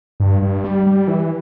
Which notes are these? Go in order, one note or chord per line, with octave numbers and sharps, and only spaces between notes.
G2
G2
G3
G3
E3